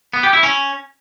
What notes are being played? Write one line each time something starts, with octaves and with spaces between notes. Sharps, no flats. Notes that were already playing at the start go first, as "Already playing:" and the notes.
B3
G4
E4
C#4